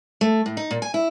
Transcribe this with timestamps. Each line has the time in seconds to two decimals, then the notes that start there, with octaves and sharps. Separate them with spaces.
0.21 A3
0.46 A2
0.57 D#4
0.71 A#2
0.82 G#5
0.94 E4